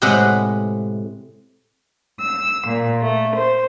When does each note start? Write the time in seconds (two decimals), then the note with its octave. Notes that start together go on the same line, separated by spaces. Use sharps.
0.02 A2 C3 G#3 B4 F#5 B5
2.18 E6
2.66 A#2
3.01 A3
3.35 C5